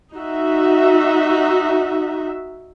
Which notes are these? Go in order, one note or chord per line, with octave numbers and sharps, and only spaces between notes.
D#4 F#4 E5